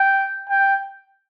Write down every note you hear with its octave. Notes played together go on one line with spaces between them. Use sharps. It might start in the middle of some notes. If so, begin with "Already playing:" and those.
Already playing: G5
G5